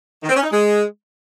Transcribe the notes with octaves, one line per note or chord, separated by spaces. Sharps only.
D#3
C4
C#4
D#4
G#3